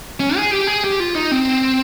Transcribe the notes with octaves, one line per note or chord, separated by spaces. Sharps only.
C#4
G#4
G4
G#4
G4
F4
D#4
C4